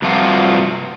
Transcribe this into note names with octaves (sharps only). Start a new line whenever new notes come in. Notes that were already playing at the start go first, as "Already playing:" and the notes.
G2 C3 F3 F4 F#4